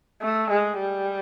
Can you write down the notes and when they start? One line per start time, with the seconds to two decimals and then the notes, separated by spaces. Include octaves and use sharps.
0.22 A3
0.51 G#3
0.81 G3